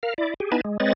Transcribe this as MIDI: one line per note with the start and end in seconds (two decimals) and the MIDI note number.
0.03 0.14 70
0.03 0.14 77
0.18 0.34 64
0.18 0.34 74
0.40 0.51 67
0.40 0.51 68
0.52 0.61 59
0.52 0.61 63
0.52 0.61 64
0.52 0.61 71
0.52 0.61 80
0.52 0.61 81
0.65 0.77 56
0.80 0.93 56
0.80 0.93 60
0.80 0.93 71
0.80 0.93 73
0.80 0.93 75
0.80 0.93 93